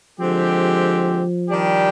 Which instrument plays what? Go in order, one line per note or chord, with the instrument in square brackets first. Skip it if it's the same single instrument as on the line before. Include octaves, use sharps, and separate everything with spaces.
[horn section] D3 G#3 C4 G4 [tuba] F3
[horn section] D#3 G3 D4 G4